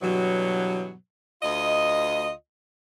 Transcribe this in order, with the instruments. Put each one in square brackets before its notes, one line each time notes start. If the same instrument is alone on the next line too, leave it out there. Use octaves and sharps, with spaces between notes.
[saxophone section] G2 B2 E3 F#3
D2 F4 D#5